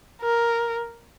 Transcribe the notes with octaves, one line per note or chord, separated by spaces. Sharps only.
A#4